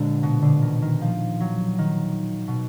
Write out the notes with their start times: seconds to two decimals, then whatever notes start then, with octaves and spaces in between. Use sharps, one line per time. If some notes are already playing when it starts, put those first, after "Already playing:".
Already playing: A#2 D3 G#3 D4
0.23 B2
0.42 D3
0.62 D#3
0.82 D#3
1.01 F3
1.40 F#3
1.79 D#3
2.48 B2